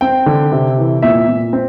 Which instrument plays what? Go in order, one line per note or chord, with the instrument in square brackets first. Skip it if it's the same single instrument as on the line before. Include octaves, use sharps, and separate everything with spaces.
[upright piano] C4 G5
D3
C3
E3
A#2 E5
A#2
C4